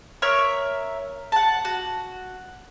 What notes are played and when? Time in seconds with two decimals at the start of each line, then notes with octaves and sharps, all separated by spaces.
0.22 A#4 C#5 E5 C#6
1.32 F#5 A5
1.65 F#4